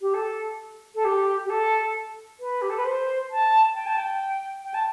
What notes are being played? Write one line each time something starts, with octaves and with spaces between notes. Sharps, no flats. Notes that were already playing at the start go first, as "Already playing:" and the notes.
G4
A4
A4
G4
G4
A4
B4
G4
A4
B4
C5
A5
G5
A5
G5
G5
A5